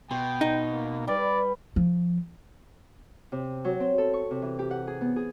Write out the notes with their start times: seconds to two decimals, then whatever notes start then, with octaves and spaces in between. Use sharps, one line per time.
0.11 B2 G5 C6
0.41 D#4
0.71 A#3
1.07 G3 B4 D5
1.76 F3
3.32 C3
3.65 F#3
3.80 C4
3.98 A4
4.13 C#6
4.31 C3
4.42 E3
4.59 G4
4.71 F#5
4.87 G#4
5.01 B3
5.16 G#4